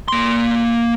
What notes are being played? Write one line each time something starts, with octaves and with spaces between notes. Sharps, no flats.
A#3 C6